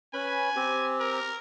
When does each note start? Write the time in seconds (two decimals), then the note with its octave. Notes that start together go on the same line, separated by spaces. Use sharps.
0.14 C#4 B4 G#5 B5
0.56 C4 G4
1.00 A#4